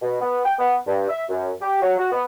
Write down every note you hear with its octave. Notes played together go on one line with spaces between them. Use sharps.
B2
B3
G5
B3
G2
E5
F#2
G4
F#3
F#4
B3